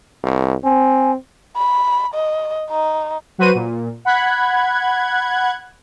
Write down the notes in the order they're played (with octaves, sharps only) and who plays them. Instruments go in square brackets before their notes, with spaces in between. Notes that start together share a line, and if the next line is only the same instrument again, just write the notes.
[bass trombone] C2
[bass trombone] C4 [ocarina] G#5
[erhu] B5
D#5
D#4
[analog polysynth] F#3 F#4 B4 C5 D#7
A#2
F#5 B5 F#6 G#6